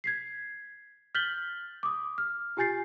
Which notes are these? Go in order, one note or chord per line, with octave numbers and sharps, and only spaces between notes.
G#6 B6 C7
F6 G6 A6 B6 F#7 G7
D6 D#6
F6
F4 G4 G#5 G6 A6 C7